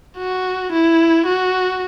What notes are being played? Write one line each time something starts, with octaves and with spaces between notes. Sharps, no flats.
F#4
E4
F#4